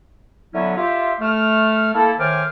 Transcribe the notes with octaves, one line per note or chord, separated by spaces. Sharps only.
D3 F#3 B3 C#4 E4
F4 G4 E5
A3 F6
A#3 E4 A4
A2 D#3 C5 G#5 D6 F6